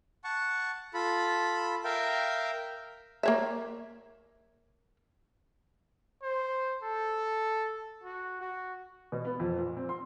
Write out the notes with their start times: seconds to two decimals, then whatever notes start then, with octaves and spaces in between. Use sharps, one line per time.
0.24 F#5 A5 C#6
0.94 F4 A4 B5
1.84 A#4 E5 F5 G5
3.23 A#3 C#5 E5
6.23 C5
6.83 A4
8.04 F#4
8.41 F#4
9.12 B2
9.25 B3
9.39 F2
9.57 A#2
9.77 C4
9.89 C6